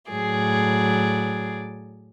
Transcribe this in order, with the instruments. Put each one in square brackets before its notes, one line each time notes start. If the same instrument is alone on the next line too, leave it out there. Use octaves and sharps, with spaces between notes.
[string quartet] A2 F#3 G#4 D5